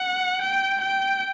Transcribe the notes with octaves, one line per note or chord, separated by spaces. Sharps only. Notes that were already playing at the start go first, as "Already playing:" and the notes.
Already playing: F#5
G5
G5